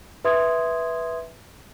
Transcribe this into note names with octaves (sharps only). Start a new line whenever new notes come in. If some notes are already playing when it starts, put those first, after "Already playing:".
B4 E5 C6 D#6 G#6